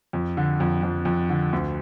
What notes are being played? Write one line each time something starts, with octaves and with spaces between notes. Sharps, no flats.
F2
D3
F2
F2
F2
D3
D2